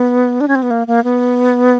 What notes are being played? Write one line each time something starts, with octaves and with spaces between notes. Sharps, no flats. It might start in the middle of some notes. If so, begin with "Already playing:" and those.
Already playing: B3
D4
C#4
C4
B3
A#3
A#3
B3